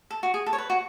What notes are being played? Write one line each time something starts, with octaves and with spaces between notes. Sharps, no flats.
A4
F#4
G#4
A4
C#5
B4
F#4